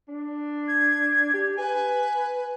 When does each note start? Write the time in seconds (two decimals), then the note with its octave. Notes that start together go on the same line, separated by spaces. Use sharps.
0.08 D4
0.68 G#6
1.33 G4
1.58 B4 G#5